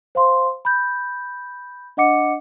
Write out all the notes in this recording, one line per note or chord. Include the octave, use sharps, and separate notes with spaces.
C5 F5 C6
B5 G6
D4 D#5 F#5 D6 C#7